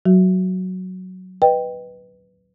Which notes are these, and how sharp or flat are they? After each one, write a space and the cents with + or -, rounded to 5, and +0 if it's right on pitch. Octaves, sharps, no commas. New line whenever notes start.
F#3 +0 F#4 +0
B4 +0 D#5 -15 G5 +0